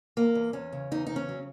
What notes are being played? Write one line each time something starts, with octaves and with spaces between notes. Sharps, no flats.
E2 A#3
E2
E2 C#4
C#3
E2 D#4
C#3 D#4
C#4
F#3